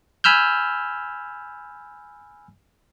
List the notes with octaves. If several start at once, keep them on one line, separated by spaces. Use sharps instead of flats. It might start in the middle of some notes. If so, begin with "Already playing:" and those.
G#5 B5 E6 F6 G6